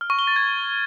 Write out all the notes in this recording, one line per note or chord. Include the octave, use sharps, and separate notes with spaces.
F6
C#6
G7
A6
G#6